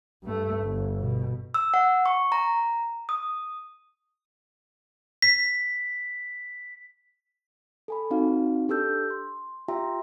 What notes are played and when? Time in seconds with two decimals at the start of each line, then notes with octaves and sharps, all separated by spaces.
0.23 G2 A3
0.63 G1
1.00 B2
1.54 E6
1.74 F#5
2.06 C#6
2.32 A#5
3.09 D#6
5.22 B6
7.88 A4 G#5 B5
8.10 C4 D#4 F#4 F5
8.68 D4 G4 A4 E6 G6
9.10 C6
9.68 F4 G4 E5 G5 A#5 C6